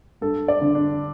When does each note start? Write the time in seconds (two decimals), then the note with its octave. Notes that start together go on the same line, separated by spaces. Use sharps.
0.21 G2 A4
0.48 D5
0.61 D3
0.75 D4